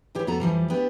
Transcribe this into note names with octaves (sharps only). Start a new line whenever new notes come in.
E3 E4 G4 C5 C#5
F2 B3 F#4 A4 A#5
F2 E3 F3 G3
B3 D4 E4 G4